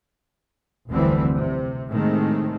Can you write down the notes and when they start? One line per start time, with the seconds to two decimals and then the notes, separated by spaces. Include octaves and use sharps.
0.90 F1 D2 D3 E3 G3 C4
1.36 C3
1.91 A2 C3 D#3 G#3 A3 C4